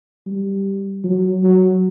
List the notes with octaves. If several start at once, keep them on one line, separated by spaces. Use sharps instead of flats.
G3
F#3
F#3